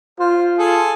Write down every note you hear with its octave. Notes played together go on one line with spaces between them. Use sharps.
F4 C5
G#4 A4